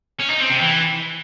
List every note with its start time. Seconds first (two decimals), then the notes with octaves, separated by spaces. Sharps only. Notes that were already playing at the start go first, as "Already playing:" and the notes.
0.20 C#4
0.30 D#4
0.40 C4
0.50 C3
0.61 E3